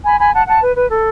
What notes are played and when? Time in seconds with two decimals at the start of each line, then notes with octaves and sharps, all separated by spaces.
0.04 G#5 B5
0.18 G#5 B5
0.33 F#5 A5
0.46 F#5 A5
0.61 B4
0.76 B4
0.89 A4